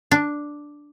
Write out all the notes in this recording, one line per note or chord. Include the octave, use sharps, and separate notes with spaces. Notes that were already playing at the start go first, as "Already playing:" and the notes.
D4